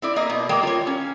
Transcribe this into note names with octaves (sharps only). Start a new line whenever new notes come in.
C4 E4 D5
A#3 D#5
B2
G3 G#3 A#3 G5
F4 C#5
C#4